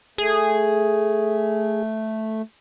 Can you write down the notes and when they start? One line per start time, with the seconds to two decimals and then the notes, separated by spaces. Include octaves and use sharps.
0.18 A3 G#4